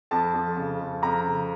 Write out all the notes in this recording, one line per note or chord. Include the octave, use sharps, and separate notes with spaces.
F2 A5
F2
C#3
F2
F2 A#5
C#3